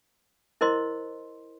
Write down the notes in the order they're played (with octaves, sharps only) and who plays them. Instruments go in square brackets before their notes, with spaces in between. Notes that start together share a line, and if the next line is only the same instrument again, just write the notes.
[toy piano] E4 A#4 C5 D#5 C6